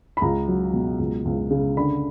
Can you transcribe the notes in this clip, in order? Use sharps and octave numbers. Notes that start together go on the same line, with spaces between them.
B5
C#2 A#5
F#3
B2
C#2
C#2
C#3
D3 B5